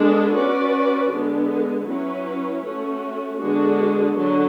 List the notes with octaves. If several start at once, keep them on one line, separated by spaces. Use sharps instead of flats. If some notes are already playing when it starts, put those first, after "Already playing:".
Already playing: G#3 B3 D4 A4
C#4 F#4 B4 D5
D3 G#3 B3
F#3 C#4 E4 B4
A3 C#4 F#4
D3 G#3 B3 D4 F#4
D3 F#3